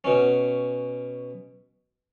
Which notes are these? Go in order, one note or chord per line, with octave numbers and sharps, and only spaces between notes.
B2 C#4